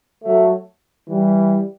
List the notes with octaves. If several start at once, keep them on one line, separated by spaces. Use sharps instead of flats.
F#3 A3
E3 G3